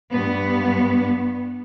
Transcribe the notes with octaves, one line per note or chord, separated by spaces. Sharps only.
G2 B3